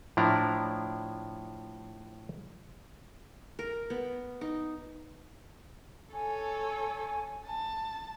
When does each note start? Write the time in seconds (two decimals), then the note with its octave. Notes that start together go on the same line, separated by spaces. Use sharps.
0.17 A2 F3 D4 E4 D5 A#5
3.59 A#4
3.90 B3
4.41 D#4
6.14 A4 C#5 G#5
7.46 A5